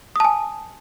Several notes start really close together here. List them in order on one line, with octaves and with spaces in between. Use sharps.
D#6 A5 G#5